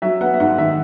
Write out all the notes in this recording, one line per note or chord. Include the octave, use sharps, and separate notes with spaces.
F#3 E5
B3 F#5
E5
G#2 F#5
D#3 E5